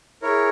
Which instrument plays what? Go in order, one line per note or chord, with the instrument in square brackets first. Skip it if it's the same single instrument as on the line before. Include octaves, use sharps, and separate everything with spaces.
[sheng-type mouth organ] E4 A#4 C#5 [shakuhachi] G#4